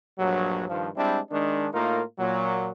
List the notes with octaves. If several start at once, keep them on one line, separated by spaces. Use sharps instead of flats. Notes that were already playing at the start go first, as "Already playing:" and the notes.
A#1 G2 F#3
G2 D#3 F3
G3 G#3 C4 D4 E4
D#3 G#3 D4
A2 A#3 D#4 F4 A#4
A#2 F#3